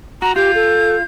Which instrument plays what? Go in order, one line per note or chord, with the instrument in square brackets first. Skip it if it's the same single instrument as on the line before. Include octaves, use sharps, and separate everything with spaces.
[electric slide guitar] F#4 [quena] A#5
[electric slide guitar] F4 [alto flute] G4 [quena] G6
[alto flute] A4